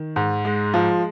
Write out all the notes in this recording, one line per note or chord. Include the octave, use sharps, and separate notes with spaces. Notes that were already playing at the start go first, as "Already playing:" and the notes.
Already playing: D#3
G#2
G#3
F3